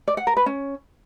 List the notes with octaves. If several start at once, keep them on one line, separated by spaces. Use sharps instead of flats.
D5
F#5
A#4
B4
C#4